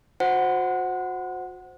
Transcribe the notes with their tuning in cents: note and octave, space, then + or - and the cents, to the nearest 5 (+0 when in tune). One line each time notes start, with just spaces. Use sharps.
F#4 -35 C5 +0 F#5 +0